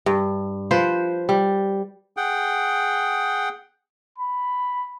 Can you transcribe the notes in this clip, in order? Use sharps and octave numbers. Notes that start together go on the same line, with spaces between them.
G2
F3 B4 C5
G3
G#4 F#5 G5
B5